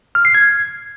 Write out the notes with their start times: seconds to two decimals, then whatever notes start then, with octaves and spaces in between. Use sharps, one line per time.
0.15 F6
0.25 C7
0.35 G#6